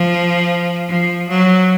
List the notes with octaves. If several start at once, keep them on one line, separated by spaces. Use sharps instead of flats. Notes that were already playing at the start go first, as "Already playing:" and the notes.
Already playing: F3
F3
F#3